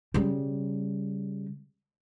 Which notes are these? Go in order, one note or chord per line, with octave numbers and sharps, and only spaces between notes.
C#3 G3